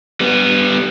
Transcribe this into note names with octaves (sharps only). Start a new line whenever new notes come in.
G3 B3